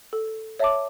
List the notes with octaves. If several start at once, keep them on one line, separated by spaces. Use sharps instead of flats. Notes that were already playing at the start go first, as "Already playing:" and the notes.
A4
C#5 E5 A5 D6